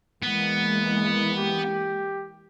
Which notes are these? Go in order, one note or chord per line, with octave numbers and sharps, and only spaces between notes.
E3 G#3 A#3 B3
G4